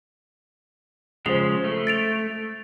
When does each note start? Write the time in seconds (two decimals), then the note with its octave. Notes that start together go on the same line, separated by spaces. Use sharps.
1.26 C#3 F3 G#3 C5 F7
1.64 A3
1.87 A6 D7 F7